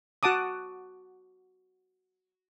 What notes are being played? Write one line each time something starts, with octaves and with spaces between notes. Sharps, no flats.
F#4 F#5 A5 D6 D#6